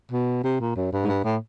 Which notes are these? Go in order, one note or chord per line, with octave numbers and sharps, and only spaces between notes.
B2
C3
A#2
F#2
G2
G#2
G2
A2